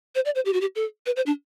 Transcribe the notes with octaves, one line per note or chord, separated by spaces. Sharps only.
C5
D5
C5
G4
F#4
G4
A4
B4
C5
D4